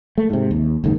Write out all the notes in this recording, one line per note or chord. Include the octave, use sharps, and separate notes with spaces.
A3
G#2 C3
D#2
F#1 D#2 G#2 D#3